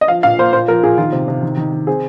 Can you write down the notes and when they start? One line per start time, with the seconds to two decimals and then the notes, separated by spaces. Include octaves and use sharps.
0.01 D#5
0.08 F3 F5
0.23 A#2 F5
0.39 A#3 C5
0.53 A#2 C5
0.68 F3 A#4
0.83 A#2 G#4
0.98 D#3 F4
1.12 C3
1.28 C3
1.43 D#3
1.57 D#3
1.73 D#3
1.87 C4 G#4